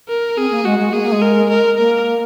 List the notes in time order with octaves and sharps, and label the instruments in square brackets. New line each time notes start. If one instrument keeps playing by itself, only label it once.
[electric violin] A#4
[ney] C4 [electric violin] G#4
[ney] A#3
[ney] G#3 [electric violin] F#4
[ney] G#3
[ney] A#3 [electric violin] G#4
[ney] A#3
G#3
[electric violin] A#4
A#4
[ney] A#3 [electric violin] A#4